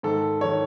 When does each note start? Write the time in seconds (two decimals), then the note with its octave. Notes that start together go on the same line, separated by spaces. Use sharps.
0.03 G#2 D#3 A4
0.41 D#3 C#5